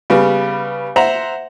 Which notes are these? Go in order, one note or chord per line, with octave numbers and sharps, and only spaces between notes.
C#3 G3 B3
C5 E5 F#5 A#5